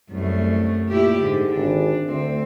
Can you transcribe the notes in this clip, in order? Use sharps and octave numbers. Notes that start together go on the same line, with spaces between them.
C2 F#2 A3
A#2 E4 G4
G#2 D3
G#1 D4
D2 C4